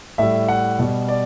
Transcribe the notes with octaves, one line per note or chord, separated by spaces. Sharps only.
A2 G3 E5
F#5
B2 G3
D5